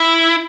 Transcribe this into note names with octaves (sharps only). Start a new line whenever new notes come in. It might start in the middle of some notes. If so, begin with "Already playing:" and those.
Already playing: E4